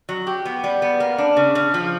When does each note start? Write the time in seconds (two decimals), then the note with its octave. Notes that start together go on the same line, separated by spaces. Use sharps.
0.09 F#3
0.27 G4
0.45 B3
0.64 G3
0.82 B3
1.00 A#3
1.18 D4
1.37 C#3
1.55 C#3
1.74 F3